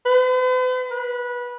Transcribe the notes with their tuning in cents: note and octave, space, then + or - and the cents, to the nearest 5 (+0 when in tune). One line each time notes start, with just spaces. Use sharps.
B4 +45
B4 -20